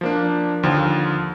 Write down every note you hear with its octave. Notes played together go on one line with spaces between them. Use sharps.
F3 A#3 D4
D#2 D3 F3